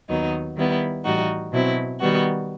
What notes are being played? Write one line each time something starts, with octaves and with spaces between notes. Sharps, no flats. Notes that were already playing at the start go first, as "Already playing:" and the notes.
D#2 D#3 F#3 B3 D#4
D#3 G3 B3 E4
A2 E3 G3 D#4 F#4
B2 F#3 C4 E4
D#3 G3 B3 F#4